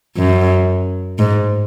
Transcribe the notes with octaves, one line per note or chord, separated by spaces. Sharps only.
F#2
G#2